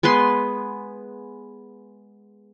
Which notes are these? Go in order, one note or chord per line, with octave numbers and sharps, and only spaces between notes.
G#3 B3 B4 C6